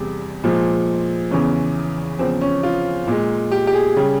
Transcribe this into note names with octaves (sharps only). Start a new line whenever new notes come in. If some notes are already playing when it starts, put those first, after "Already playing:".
Already playing: E2 C3 G3 G#4
A#2 F3 G#3
E2 C#3 E3 C#4
E2 C#3 F3 C4
C#4
F4
A#2 G#3
G4
G4
G#4
C#3 G3